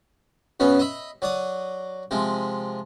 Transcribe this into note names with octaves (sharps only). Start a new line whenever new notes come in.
F#2 C#3 B3 C#4
D#5 E5 B5
F#3 D5 D#6
C3 F3 G#3